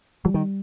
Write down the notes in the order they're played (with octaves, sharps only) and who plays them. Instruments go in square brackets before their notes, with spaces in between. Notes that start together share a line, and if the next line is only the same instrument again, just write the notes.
[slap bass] F3 [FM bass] G3
[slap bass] D#3